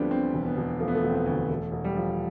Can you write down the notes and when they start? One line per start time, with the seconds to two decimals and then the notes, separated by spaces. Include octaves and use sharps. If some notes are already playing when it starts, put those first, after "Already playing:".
Already playing: D2 D3 F3 G3 A3 B3 C4 D4
0.11 D3 C4
0.34 E1
0.46 B3
0.57 E1
0.80 F3 A3
0.88 B3
0.95 A3
1.04 E1
1.09 C4
1.15 B3
1.26 D2
1.49 E1 A3
1.72 E1
1.84 G3
1.96 F3